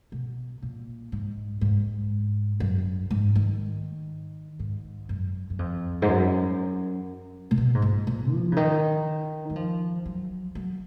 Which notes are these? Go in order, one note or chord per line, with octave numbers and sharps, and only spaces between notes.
B2
A#2
G#2
G#2
F#2
G#2
D#3
G#2
F#2
F#2
F2
G#2
F#2
A#2
B2
G#2
A#2
A#2
F3
C#3
D#3
F#3
F3
F#3
F#3